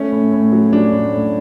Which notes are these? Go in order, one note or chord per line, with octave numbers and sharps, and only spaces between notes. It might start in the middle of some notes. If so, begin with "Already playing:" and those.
Already playing: A3 C#4
A2
A2
F#3
F#3 D4
A2
A2